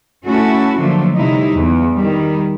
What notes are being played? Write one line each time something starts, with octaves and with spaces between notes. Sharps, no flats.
A3 C#4 E4 F#4 A4
D3 F3 F#3 A3 A#3
C3 F#3 G3 D#4 E4
E2
D#3 G3